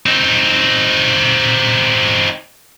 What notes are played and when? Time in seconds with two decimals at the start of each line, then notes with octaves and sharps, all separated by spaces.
0.06 C4 D#4